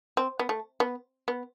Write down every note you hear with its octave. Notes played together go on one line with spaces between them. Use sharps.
C4
B3
A3
B3
B3